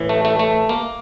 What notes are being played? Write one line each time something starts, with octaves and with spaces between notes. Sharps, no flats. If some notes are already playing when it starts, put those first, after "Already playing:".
Already playing: A2 E3
A3
A3
A3
A#3